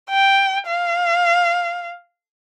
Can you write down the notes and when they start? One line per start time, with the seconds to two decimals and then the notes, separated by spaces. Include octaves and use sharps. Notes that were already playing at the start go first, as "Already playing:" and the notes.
0.10 G5
0.67 F5